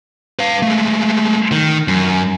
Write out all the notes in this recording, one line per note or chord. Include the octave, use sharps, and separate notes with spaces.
B4 F5
G#3 A3
D#3
F#2